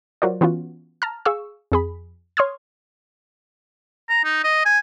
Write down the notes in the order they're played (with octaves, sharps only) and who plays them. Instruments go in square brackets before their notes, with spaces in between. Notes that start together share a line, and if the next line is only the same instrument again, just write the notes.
[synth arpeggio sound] F#3 F4 F#4 A#4 C5 D5
E3 B3 C#4 F4 F#4
A5 A#5 F6
G#4 F5 C#6 E6
F2 G#4 B5
C#5 C6 C#6 D#6 F6 G#6
[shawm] A#5
D#4
D#5
G#5